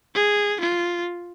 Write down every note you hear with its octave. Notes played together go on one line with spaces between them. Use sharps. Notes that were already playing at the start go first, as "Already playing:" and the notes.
G#4
F4